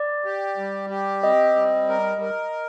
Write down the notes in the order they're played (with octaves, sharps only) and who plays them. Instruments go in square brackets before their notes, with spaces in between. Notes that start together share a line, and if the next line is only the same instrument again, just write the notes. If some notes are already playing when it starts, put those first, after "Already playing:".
Already playing: [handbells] D5
[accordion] G4
G3
G4
[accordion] C4 [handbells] D#5
[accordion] G3
A#4
A#4